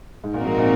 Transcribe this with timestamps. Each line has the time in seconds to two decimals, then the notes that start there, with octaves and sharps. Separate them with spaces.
0.24 G#2
0.34 A#2 F3 C4 D#4 F#4 A#4
0.46 G#2
0.58 A#2